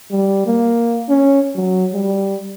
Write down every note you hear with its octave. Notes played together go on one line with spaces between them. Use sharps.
G3
A#3
C#4
F#3
G3